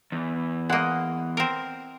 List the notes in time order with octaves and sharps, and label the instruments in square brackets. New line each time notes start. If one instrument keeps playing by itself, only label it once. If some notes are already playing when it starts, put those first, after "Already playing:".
[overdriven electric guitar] E2
[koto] G#3 A#3 [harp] D#5 F#5
[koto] C4 A#4